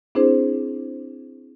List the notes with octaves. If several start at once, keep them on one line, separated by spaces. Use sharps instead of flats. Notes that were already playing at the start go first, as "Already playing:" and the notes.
C4 D4 E4 G#4 C5